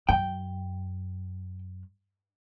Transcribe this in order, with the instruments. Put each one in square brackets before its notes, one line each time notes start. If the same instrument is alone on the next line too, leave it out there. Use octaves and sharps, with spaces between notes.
[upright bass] F#2 [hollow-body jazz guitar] G5